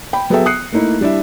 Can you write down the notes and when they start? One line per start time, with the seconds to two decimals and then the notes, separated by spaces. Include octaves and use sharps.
0.13 G5 B5
0.30 F#3 B3 G#4 A4 E5 G5
0.46 D#6 F#6 C7 C#7
0.72 A3 A#3 D#4 E4
1.01 G3 D4 E4 E5